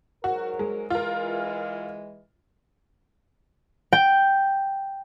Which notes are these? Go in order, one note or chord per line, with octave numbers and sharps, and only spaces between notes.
G#2 F#3 F#4 A#4
G#3
E3 G#3 F4 A#4
G5